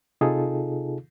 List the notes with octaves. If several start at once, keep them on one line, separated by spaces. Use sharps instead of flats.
C3 D#4 F4 G#4 A4